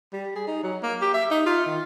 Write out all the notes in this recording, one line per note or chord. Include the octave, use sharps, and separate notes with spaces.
G3
G#4
D#4
F#3
A#3
G4
E5
D#4
F4
D#3